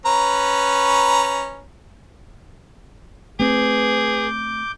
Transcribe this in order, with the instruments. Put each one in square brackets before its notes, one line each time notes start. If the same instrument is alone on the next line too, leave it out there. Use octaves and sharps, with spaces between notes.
[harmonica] C#4 B4 A#5
[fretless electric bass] A3 C4 [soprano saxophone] G#4 [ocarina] B4 [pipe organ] D6 G6